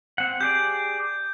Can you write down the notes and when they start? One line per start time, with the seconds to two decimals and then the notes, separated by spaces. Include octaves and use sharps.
0.18 C4 F#5
0.41 G4 G#4 D5 G6